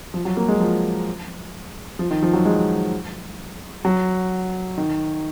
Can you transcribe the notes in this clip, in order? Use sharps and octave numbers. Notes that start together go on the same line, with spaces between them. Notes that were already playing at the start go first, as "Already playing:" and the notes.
F3
F#3
A#3
G#3
F3
F3
D#3
F3
F#3
G#3
F#3
D#3